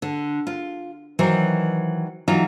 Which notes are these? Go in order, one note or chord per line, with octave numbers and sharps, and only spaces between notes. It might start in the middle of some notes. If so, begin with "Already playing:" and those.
D3
F4
D#3 E3 F#3 C5
E3 F#3 D#4 F4